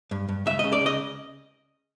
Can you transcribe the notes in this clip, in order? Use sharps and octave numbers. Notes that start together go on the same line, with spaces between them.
G2
G2
C#2 E5
D#5
C#3
D5
C#2 D#5